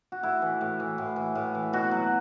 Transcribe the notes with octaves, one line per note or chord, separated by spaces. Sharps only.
F#4
A2 E4
E3
A2
E3
A2
E3
A2
E3
B2 F#4
F#3